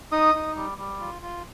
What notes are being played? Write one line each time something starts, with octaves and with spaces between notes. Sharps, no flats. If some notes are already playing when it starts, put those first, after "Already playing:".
D#4 D#5 D#6
D#4
G3
G3
F4
F4